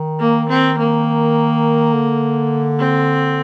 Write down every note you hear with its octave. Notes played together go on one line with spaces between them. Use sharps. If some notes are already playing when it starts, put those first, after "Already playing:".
Already playing: D#3
A#3
C4
A#3
D3
C4